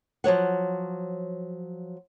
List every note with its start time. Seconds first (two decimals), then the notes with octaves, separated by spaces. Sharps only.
0.24 F3 F#3 C#5 F#5